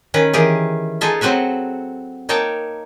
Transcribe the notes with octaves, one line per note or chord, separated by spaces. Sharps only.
D#3 C#4 B4
D#3 E3 G4 G#4
D#4 F4 G#4 A4 D#5 E5
F#3 C4 F#4 B4 E5
A#3 D#4 C#5 G5 A5